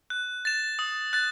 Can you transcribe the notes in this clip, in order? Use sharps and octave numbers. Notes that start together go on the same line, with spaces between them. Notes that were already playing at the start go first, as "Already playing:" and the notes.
F#6
A6 E7
D#6
F#6 A6